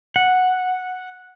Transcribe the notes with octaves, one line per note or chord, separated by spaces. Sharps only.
F#5